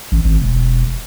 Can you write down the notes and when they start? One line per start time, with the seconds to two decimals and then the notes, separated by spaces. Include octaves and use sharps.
0.12 A1
0.25 G#1
0.42 E1